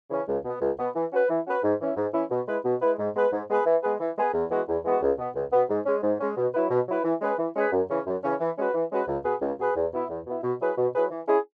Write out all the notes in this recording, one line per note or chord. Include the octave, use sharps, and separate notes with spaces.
C#3 E3 C#4
C#2
B2 B3
C#2
B2 B3
E3
C#4 F#4 B4
E3
C#4 F#4 B4
G#2
E3 C#4 E4
G#2
E3 C#4 E4
B2
G#3 E4 B4
B2
G#3 E4 B4
G#2
G#3 B3 G#4 B4
G#2
G#3 B3 G#4 B4
E3
G#3 B3 G#4 B4
E3
G#3 B3 G#4 B4
E2
E3 G#3 B3 F#4
E2
E3 G#3 B3 F#4
C#2
B2 B3
C#2
B2 B3
G#2
G#3 C#4
G#2
G#3 C#4
B2
F#3 E4 B4
B2
F#3 E4 B4
E3
G#3 C#4 G#4 B4
E3
G#3 C#4 G#4 B4
F#2
C#3 E3 C#4
F#2
C#3 E3 C#4
E3
G#3 C#4 F#4 B4
E3
G#3 C#4 F#4 B4
C#2
B2 B3 G#4 B4
C#2
B2 B3 G#4 B4
E2
B2 B3 E4
E2
B2 B3 E4
B2
F#3 E4 G#4 B4
B2
F#3 E4 G#4 B4
E3
C#4 E4 G#4